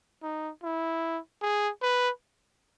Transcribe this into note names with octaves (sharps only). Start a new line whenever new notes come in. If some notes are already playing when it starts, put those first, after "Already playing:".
D#4
E4
G#4
B4